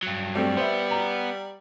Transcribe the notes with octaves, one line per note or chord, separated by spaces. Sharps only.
G2 F#3
G3 A3 C4
B3 B4 C5 E5
A#5